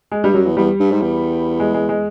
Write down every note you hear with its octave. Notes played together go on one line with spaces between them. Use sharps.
G#3
G2 G3
F#2 F#3
E2
E2 G3
G2
G#2
E2
G#3
G#3
G#3